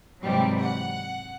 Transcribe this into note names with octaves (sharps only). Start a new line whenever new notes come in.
G#2 C3 E3 F#3 G3
F#5